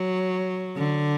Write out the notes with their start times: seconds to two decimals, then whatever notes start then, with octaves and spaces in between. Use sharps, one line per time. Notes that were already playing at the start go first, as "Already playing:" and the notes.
Already playing: F#3
0.77 D3